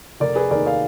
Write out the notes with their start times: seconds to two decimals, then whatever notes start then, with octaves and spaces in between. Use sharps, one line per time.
0.20 F1 A#4 D5
0.36 G#4 B4
0.51 D#2 D#3 A#4 D5
0.66 D5 F5